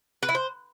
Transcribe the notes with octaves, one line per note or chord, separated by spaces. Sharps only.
B4
E4
C5